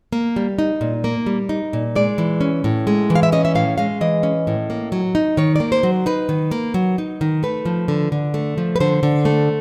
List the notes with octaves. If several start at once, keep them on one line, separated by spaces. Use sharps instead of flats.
A#3
G3
D#4
A#2
A#3
G3
D#4
A#2
G#3 D5
E3
C#4
A2
G#3
E3
F5
E5
C#4 D#5
E5
A2 F5
G#3 F5
E3 D#5
C#4
A2
A#3
F#3
D#4
D#3 C#5
A#3 D5
C5
F#3
D#4 B4
D#3
A#3
F#3
D#4
D#3
A3 B4
F3
D3
D3
A3
F3
B4
D3 C5
D3
A3